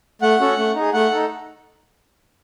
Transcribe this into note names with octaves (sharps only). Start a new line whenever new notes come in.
A3 F#5
C#4 F#4 A4
A3
D#4 G#4
A3 F#5
D#4 A4